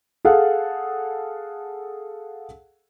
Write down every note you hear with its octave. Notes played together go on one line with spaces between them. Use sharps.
G#4 A4 F5 F#5